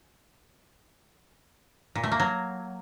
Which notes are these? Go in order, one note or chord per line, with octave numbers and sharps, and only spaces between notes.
A#2
A3
A#3
F#3